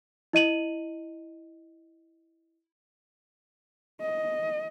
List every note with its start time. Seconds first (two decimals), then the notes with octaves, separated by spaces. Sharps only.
0.33 E4 D#5 D#7 F#7
4.01 D#5